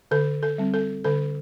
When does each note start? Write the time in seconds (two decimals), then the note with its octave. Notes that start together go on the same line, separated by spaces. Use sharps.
0.11 D3 A4
0.43 A4
0.58 G3 C4
0.74 A4
1.04 D3 A4